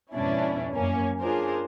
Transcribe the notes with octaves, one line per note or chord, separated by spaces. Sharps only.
F2 G#2 B2 C#4 D4 E4
F#2 A#3 C#4
C#4 D4 F4 G#4 A#4 C5